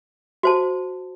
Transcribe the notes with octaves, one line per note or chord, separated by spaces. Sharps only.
F#4 C5 A5